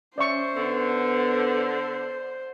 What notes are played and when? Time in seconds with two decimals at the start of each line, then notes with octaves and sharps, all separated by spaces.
0.18 C#4 C5 D5 E5 C#6
0.56 D3 B3